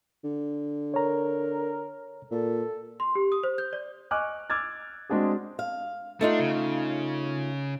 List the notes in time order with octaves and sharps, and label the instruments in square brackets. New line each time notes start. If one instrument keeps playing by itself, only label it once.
[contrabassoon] D3
[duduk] A#4 [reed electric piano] C#5 A#5
[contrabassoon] A#2 [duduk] A4
[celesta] C6
G4
D#6
C5
G6
D5
[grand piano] D#5 G#5 C#6 D6 F6 F#6
D6 E6 F6 G#6 A6
G#3 C4 D4 F#4 G#4
[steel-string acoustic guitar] F5
[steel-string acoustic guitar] A3 D#4 F4 [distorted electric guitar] D4
[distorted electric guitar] C#3